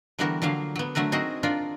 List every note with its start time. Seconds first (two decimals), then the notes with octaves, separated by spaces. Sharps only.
0.19 D3 E3 G3 B3 F#4 A#4
0.42 D3 F3 F#3 A#3 F5
0.76 F#3 B3
0.95 D3 F#3 A3 A#4 B4
1.12 C4 D#4 F#4 G#4 A#4 D#5
1.43 D4 F4 A#4 D5